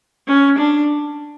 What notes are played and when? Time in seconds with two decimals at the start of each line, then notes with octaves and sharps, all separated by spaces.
0.28 C#4
0.59 D4